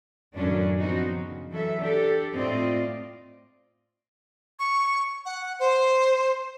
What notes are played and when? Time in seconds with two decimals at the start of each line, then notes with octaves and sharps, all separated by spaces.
0.35 F#2 A2 D#3 F#3 C#4 D4
0.79 F3 B3 C4 D4 D#4 F#4
1.11 C#3
1.50 E3 F#3 A4 E5
1.78 D4 G4 A4
2.34 A2 A3 C4 F4 D5 D#5
4.59 C#6
5.25 F#5
5.59 C5